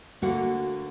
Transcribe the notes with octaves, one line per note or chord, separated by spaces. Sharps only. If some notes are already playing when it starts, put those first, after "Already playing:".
D2 D3 A#3 F#4 F#5